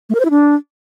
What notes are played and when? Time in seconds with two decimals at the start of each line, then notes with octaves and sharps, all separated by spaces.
0.09 A3
0.15 A#4
0.20 C5
0.25 E4
0.30 D4